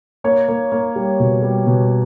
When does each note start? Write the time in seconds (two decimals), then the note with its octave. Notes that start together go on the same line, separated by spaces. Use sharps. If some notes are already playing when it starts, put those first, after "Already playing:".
0.24 A#3 C#5
0.49 A#3
0.72 A#3
0.96 G3
1.20 B2
1.43 G3
1.67 B2